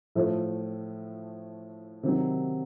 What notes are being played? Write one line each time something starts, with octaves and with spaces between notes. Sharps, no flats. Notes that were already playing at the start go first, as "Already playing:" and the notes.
A2 F3 A3
C3 D#3 F#3